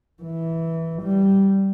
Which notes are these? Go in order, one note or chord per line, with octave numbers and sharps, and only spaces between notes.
E3
G3